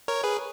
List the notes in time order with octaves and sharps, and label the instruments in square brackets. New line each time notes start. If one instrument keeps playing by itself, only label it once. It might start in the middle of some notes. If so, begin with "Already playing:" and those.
[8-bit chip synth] A#4 C#5
G#4 B4